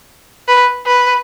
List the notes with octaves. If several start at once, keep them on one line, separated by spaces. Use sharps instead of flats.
B4
B4